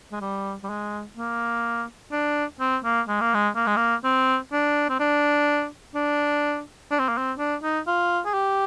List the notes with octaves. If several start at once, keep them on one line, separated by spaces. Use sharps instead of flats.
G#3
G3
G3
G#3
A#3
D4
C4
A#3
G#3
A#3
G#3
A#3
G#3
A#3
C4
D4
C4
D4
D4
D4
C4
A#3
C4
D4
D#4
F4
G#4
G4